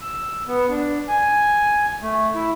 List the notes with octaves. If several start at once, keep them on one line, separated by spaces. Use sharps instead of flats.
E6
B3
D4
G#5
A3
E4